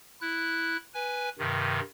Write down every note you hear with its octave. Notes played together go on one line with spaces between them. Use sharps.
E4 F#6
B4 G#5
G2 C3 D#3